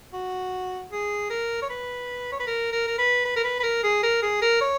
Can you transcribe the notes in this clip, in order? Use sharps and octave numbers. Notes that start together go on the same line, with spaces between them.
F#4
G#4
A#4
C#5
B4
C#5
B4
A#4
A#4
A#4
B4
B4
A#4
B4
B4
A#4
G#4
A#4
G#4
A#4
C#5